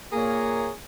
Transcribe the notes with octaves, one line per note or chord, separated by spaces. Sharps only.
A#2 A#3 G#4 A#4 C#5